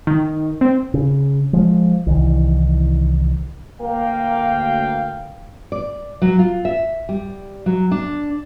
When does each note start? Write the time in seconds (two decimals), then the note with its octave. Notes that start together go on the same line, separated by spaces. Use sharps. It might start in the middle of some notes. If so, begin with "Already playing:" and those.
0.07 D#3
0.61 C4
0.94 C#3
1.53 F3 G#3
2.07 C2 D#3 E3
3.81 D2 A#3 F5 G5
5.72 D5
6.22 F#3
6.39 F4
6.65 E5
7.09 G3
7.66 F#3
7.91 D4